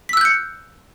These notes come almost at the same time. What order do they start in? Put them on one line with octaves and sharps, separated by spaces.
B6 E6 F#6 G6 C#7